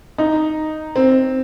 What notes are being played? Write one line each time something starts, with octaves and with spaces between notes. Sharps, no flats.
D#4
C4